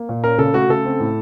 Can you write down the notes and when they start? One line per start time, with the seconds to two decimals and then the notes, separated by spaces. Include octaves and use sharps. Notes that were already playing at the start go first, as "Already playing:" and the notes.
Already playing: A#3
0.09 A#2
0.23 C#4 A#4
0.38 C#3 A4
0.54 A3 F#4
0.69 C#3 A4
0.85 C4
1.00 A2